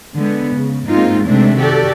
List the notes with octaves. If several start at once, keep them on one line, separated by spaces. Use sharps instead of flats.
D3 G#3 B3
C#3
G#2 G#3 A#3 C4 D#4 F4
C3 D#3 G#3 A3 C4 D4
F#4 G4 A4 D5